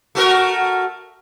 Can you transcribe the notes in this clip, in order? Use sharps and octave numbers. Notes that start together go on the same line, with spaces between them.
A3 F#4 A#4